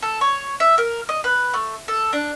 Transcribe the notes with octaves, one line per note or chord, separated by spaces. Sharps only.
A4
C#5
E5
A#4
D#5
B4
A3
A4
D4